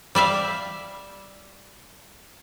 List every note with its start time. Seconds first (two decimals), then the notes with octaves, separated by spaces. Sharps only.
0.15 G3 D5 E5 F5